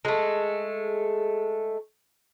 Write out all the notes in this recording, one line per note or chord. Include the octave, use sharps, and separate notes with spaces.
G#3 A3